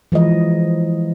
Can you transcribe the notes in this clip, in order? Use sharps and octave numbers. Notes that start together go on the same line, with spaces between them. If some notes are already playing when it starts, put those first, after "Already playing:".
E3 F3 G#3 D#5